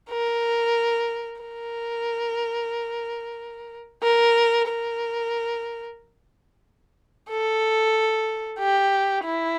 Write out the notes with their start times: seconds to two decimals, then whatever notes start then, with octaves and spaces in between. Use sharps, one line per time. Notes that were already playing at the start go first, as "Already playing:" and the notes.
0.11 A#4
1.41 A#4
4.03 A#4
4.68 A#4
7.29 A4
8.59 G4
9.25 E4